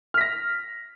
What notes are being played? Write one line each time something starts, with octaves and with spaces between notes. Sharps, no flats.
F6 A#6 B6